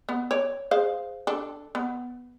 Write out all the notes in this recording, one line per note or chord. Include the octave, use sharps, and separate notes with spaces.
B3
C#5 D5
G#4 C5 F5
D4 A4
B3